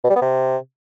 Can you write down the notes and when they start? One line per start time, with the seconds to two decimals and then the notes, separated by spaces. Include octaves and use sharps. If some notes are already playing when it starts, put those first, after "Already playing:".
0.04 B2
0.10 G3
0.16 B3
0.22 C3